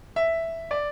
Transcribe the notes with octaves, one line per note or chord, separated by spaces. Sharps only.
E5
D5